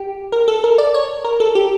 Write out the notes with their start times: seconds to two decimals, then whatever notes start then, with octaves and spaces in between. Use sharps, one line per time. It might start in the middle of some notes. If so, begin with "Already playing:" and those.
Already playing: G4
0.32 A#4
0.48 A4
0.64 A#4
0.78 D5
0.94 C#5
1.24 A#4
1.40 A4
1.55 G4